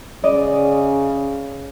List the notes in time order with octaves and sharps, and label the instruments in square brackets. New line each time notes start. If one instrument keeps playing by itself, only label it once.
[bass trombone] C#3 [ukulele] D5 D#5